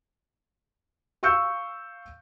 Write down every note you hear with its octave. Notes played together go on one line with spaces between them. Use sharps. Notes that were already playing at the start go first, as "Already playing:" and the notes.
F5 C#6 E6 G6 C#7